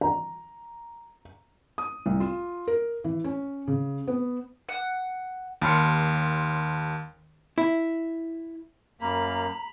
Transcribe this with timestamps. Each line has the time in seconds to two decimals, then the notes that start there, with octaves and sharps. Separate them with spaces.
0.01 A#5
1.78 D#6
2.06 C2
2.20 F4
2.67 A#4
3.04 E3
3.24 C#4
3.67 C#3
4.07 B3
4.69 F#5
5.62 D#2 A5 B5 C6 F6 C#7
7.58 E4
9.01 F#2 A#3 A#5 B5